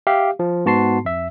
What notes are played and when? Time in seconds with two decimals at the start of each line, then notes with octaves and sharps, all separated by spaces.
0.07 G4 E5 F5
0.39 F3
0.65 G#2 B3 F#4 A5 C6 C7
1.05 F2 E5